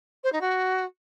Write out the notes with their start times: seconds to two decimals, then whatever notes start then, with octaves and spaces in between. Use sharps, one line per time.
0.23 C5
0.32 D#4
0.41 F#4